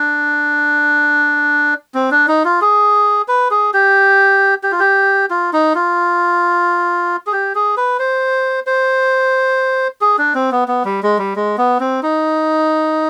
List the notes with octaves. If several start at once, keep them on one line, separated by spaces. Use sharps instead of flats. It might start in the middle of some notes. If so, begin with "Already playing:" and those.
Already playing: D4
C4
D4
D#4
F4
G#4
B4
G#4
G4
G4
F4
G4
F4
D#4
F4
G#4
G4
G#4
B4
C5
C5
G#4
D4
C4
B3
B3
G3
G#3
G3
G#3
B3
C4
D#4